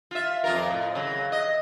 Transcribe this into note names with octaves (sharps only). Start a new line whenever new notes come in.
F4 E5
F2 F4 A#4
A2
C#3 F#3
D#5